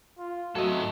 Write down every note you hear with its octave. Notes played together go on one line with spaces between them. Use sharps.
F4
F#3 A3 A4 D#5